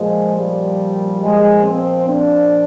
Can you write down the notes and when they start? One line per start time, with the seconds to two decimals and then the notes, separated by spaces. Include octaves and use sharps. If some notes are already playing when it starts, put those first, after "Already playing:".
Already playing: A#2 F3 G#3
0.36 G3
1.21 G#3
1.64 C4
2.07 D4